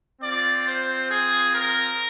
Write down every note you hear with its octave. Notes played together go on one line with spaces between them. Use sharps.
C4 F4 D5
C5
G#4
A#4